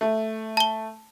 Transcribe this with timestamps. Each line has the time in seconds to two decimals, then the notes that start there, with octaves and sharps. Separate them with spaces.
0.01 A3
0.57 A5 G7